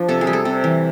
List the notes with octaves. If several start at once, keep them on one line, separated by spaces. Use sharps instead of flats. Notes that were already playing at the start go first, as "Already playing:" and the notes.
Already playing: F3 D4
C3 A4
G#4
G3
A4
C3
E3